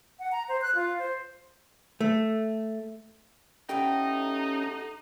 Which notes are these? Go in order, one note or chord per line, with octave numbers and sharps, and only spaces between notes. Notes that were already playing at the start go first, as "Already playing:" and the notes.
F#5
A#5
C5
F#6
F4
C5
A3
A2 A3 B3 C#4 D#4 G4 G5 A#5